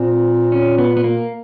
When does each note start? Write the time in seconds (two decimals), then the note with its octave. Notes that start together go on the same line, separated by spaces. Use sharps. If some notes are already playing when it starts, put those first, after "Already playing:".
Already playing: A#2 C4
0.52 C#4
0.78 B3
0.97 B3
1.04 A#3